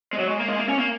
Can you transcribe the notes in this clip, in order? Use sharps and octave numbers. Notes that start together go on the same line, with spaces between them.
G#3
F#3
G#3
A#3
G#3
A#3
C#4
A#3